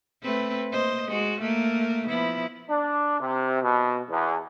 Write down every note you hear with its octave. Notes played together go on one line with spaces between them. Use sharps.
A3 C4 B4
A#3 C5 D#5
G#3 F#4
A3 A#3 A#4
F3 B3 E4
D4
C3
B2
E2